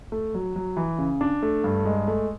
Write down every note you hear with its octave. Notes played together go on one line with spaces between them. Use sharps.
A3
F#3
F#3
E3
C#3
D4
A3
G2
G#3
A3